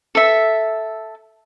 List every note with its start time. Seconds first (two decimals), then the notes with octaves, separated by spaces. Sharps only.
0.15 A4 E5